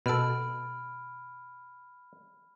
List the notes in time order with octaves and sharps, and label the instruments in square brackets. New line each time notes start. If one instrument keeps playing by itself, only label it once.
[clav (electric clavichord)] B2 A4 [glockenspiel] B5 F6 D7